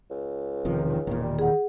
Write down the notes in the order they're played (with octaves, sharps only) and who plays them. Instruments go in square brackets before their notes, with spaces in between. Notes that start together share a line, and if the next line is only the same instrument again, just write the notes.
[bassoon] C#2
[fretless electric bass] E1 C3 F3 [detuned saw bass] D#3
[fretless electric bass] E1 A#2 [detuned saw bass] D#3
[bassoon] G3
[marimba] G#4 F#5